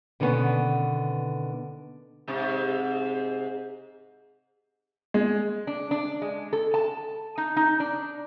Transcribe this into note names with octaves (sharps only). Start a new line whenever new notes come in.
B2 D3 D#3 G3 B3 C#4
G#2 C3
G#3
D4
D4
G#3
A4
A5
D#4
D#4
D4